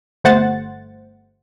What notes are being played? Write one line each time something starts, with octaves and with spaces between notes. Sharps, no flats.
G1 A3 C5 F#5 A6